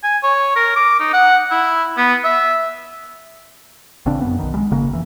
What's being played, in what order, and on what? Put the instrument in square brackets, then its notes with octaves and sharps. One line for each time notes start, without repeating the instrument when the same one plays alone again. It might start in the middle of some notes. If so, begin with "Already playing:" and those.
[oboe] G#5
C#5
A#4
D6
D#4
F#5
E4
B3
E5
[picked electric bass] A1 C#3 C4 D4
F#2 B3
B1 D#3
G3 G#3
G#1 C#3 A#3
F1 E3